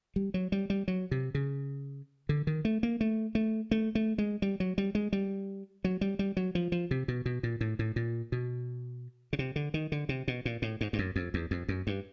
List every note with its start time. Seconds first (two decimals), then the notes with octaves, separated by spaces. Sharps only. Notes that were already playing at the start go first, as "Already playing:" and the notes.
0.16 G3
0.34 F#3
0.52 G3
0.70 G3
0.88 F#3
1.11 C3
1.35 C#3
2.29 D3
2.47 D#3
2.65 A3
2.83 A#3
3.01 A3
3.35 A3
3.71 A3
3.95 A3
4.18 G#3
4.42 G3
4.60 F#3
4.78 G3
4.95 G#3
5.13 G3
5.84 F#3
6.01 G3
6.19 G3
6.37 F#3
6.55 F3
6.72 F3
6.91 C3
7.08 B2
7.26 B2
7.43 A#2
7.61 A2
7.79 A2
7.96 A#2
8.32 B2
9.33 C#3
9.39 C3
9.56 D3
9.74 D#3
9.92 D3
10.09 C3
10.28 B2
10.45 A#2
10.62 A2
10.81 G#2
10.93 G2
10.99 F#2
11.16 F2
11.34 E2
11.51 F2
11.68 F#2
11.87 G2